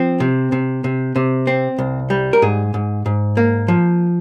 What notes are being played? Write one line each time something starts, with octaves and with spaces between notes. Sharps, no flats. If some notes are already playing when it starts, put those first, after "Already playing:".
Already playing: F3 C4
C3
C3
C3
C3
C4
C2
G3
A#4
G#2 G#4
G#2
G#2
A#3
F3